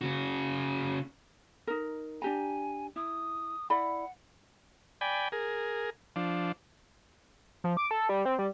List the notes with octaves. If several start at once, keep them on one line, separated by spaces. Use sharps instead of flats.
C#3 F#4
D#4 A#4
D4 G4 G#5 A#5
E4 D#6
E4 D5 F#5 B5
D5 G5 G#5 B5
G#4 A#4
F3 D4
F3
D6
A4
G3
C4
G3